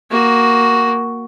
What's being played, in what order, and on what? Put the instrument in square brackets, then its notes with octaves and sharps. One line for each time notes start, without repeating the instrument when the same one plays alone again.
[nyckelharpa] A#3 F#4